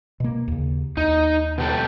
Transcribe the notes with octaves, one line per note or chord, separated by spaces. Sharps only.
B2 A#3
D#2 C#3
D#2 D#4
B2 G4 A4